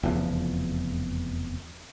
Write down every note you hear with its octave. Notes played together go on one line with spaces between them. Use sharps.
F1 E2 C#3 F3